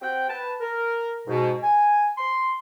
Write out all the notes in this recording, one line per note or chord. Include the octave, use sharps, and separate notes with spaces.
C4 G4 F#5 G5
B4 A5
A#4
G#2 B2
G#5
C6